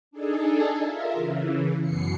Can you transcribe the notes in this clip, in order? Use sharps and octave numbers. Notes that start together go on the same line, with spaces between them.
D4 D#4 G#4 A4
F4 A#4 E5
C#3 E3
F#2 B2 C7 C#7